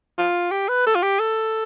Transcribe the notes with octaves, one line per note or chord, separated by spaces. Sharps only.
F4
G4
B4
A4
F4
G4
A4